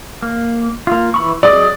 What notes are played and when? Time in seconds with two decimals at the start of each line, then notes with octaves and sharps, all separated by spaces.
0.22 A#3
0.87 A#3 F4
1.14 E3 B5 C#6
1.43 F#3 G#4 D5 D#5